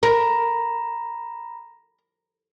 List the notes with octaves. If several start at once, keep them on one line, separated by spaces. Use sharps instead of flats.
A#4 A#5 B5 A#6